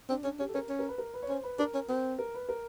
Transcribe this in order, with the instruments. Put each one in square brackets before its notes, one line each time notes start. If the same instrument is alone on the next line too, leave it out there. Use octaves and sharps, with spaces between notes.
[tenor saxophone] C4 [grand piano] D4
[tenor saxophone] C#4 [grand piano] D4
[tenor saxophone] C#4 [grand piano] G4
[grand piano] A4
[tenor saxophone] C#4 [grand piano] A#4
[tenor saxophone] C#4
[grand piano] A#4
B4
A#4
B4
C#5
[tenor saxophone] C#4 [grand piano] C5
[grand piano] B4
[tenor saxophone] D4 [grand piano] A#4
[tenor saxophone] C#4
C4
[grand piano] A#4
B4
A#4